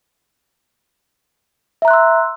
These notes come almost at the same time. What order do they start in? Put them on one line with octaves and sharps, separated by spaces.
E5 A#5 F#6 C6 E6